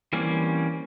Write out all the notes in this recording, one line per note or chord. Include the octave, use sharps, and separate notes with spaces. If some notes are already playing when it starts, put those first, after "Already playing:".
E3 G3 A#3 C4 C#4